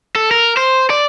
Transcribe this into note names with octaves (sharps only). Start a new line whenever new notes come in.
A4
A#4
C5
D5